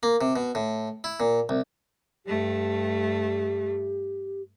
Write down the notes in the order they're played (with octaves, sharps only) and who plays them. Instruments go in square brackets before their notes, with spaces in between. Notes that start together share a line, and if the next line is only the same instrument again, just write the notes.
[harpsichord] A#3
C3
B2
A2
E4
A#2
C2
[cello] G2 A3 [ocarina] G4